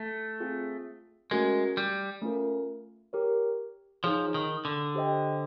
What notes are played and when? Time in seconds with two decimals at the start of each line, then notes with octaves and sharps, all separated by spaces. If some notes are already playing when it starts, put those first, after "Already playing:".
Already playing: A3
0.41 C4 F4 G#4
1.31 G#3 A3 C#4 F#4 A#4
1.77 G3
2.22 A3 C#4 F4 A#4
3.13 G4 A#4 C#5
4.04 F3 D#4 G#4 C#5
4.34 D#3
4.65 D3
4.95 G4 C5 D#5 G5